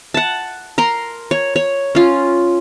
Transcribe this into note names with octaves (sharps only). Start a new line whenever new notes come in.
F#5 A5
A#4 A#5 C6
C#5
C#5
C#4 F4